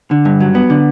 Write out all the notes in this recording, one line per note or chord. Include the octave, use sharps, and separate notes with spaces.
D3
G2
F#3
B3
D3